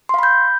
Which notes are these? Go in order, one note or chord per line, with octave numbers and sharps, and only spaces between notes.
F5 B5 C6 G6